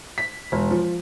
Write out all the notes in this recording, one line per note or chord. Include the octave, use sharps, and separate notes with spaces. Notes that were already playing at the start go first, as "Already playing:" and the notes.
B6
E1
F3